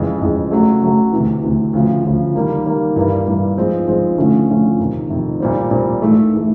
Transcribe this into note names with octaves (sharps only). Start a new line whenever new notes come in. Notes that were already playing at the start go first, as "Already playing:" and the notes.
Already playing: F2 C#3 E3 G#3
F2 C#3 E3 G#3
C#3 F#3 A3
C#3 F#3 A3
D2 C3 E3
D2 C3 E3
D2 C#3 F3
D2 C#3 F3
D#3 G3 A#3
D#3 G3 A#3
G2 E3 G3 A#3
G2 E3 G3 A#3
G#2 F3 G#3 C4
G#2 F3 G#3 C4
D3 F3 A3 C#4 E4
D3 F3 A3 C#4 E4
F2 C3 D#3
F2 C3 D#3
A#2 G3 C4
A#2 G3 C4
G#2 E3 A3
E3 A3